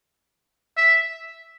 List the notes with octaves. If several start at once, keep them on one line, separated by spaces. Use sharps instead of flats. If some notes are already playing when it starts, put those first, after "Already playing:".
E5